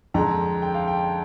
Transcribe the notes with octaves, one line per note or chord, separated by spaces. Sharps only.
F2 D3 G#3 A#5
G5
F5
G5